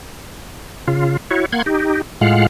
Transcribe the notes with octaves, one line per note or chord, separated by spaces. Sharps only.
C#3 F4
E4 F#4 C#5
A#3 F#5 C6 G#6
D#4 G4
A2 G#3 F4 F5 F#5